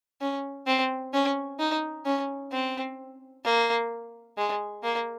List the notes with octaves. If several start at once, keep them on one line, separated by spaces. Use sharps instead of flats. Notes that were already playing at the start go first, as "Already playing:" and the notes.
C#4
C4
C#4
D#4
C#4
C4
A#3
G#3
A#3